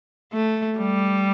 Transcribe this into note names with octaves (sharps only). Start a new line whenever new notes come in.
A3
G3